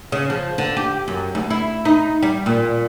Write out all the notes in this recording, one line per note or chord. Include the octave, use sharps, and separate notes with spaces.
C#3
F3
D3
G4
F#2
D2
E4
D#4
G3
A#2